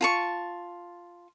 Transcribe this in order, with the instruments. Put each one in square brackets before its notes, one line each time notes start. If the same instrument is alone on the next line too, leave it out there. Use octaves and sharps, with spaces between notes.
[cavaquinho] F4 A5 C#6